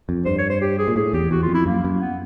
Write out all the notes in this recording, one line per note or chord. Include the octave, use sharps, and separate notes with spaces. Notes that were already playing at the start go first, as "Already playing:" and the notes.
F2
G2 C5
C#5
C5
G4
G#4
A#2
A2 G#4
E2 G4
E2 F#4
F4
F2
E4
F#2 A#3
F#2
B3